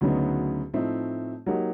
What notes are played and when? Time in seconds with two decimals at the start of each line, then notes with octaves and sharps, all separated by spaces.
0.01 D2 C#3 F#3 B3 D#4
0.73 A2 F3 A3 C4 D#4
1.46 F#3 A#3 D#4 G4